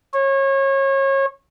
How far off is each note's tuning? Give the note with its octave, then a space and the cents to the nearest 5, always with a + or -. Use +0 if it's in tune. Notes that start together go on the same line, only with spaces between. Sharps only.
C#5 -30